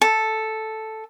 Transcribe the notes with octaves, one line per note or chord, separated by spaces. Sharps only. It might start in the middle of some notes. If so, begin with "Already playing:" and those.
A4